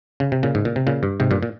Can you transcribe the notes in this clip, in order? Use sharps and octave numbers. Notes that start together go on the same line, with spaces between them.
C#3
C3
A#2 C#3
G#2
A#2
C3
A#2 C#3
G2
G#2 C3
G2 A#2
A#2